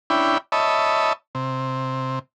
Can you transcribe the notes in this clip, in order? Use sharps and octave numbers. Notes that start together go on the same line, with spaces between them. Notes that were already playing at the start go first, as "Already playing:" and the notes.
C#4 D4 E4 G5 B5
C#5 D#5 E5 A5 B5
C3